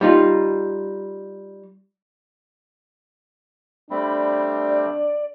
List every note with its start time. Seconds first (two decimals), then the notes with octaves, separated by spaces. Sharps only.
0.01 G3 D#4 F4
3.90 G3 A3 C4 D4 B5
4.69 D5